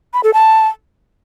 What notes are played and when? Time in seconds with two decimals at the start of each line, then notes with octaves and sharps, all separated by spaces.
0.14 B5
0.24 A4
0.34 A5